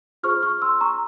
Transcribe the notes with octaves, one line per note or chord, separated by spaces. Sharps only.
F4 G#4 C5 C#6 F6
C#6 F6
C6 E6
A#5 C#6